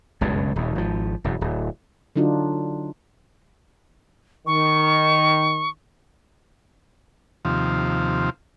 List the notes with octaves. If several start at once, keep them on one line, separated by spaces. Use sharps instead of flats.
F#1 C#2 G2 B2
D#1 D#2
G#1 F3
E1 F#2
D1
D3 F#3 D4 D#4 F4 F#4
D#3 C#6
D#2 C3 F3